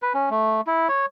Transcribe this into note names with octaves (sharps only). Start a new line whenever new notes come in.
B4
C#4
A3
E4
C#5